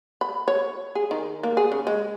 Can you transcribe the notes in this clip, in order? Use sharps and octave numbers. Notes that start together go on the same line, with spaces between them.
B5
C#5
G#4
D#3
A#3
G#4
C#3
G#3